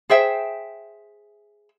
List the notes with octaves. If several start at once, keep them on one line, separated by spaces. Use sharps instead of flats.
G#4 C5 E5 G5